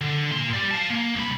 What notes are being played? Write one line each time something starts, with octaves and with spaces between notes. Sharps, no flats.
D3
A#2 C6
G4 D5
F5 A5
A#3
C2 B5